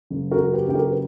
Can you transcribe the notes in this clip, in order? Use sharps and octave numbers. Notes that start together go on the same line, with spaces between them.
F#1
F#4 A#4
F#1
G4 B4
F#1 G4
F#4 A#4
B4